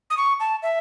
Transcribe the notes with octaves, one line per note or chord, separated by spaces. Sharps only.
D#6
C#6
A5
E5